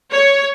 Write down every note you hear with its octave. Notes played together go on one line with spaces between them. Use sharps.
C#5